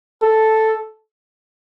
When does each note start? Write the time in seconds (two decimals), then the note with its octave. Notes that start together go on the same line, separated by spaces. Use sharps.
0.22 A4